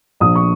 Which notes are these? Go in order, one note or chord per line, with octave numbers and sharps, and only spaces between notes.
A#1 D#6
C#6